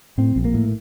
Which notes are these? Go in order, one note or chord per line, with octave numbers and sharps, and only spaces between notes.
A2 C4
A#1
A#3
A2